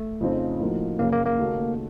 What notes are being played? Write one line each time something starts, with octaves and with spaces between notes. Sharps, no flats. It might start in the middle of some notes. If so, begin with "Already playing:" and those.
Already playing: A3
F2 C#3 F3 C4 D#4
A2 F3 A#3 D#4 F#4
F#1 F#2 C#3 A#3
A#3
A#3
D#2 C#3 A3 D#4 F#4